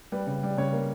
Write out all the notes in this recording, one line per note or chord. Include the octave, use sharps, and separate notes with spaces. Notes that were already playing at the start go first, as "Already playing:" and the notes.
G3 B4
C#3
G3
C#3 C#5
A#3